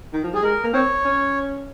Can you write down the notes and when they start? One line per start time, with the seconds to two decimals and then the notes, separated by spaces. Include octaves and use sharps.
0.13 D#3
0.23 F3
0.33 G3 G#4
0.43 G#3 A#4
0.64 A#3
0.73 C4 C#5
1.05 C#4